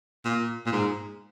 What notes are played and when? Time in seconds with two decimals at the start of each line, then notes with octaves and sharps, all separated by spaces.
0.25 A#2
0.66 A#2
0.72 G#2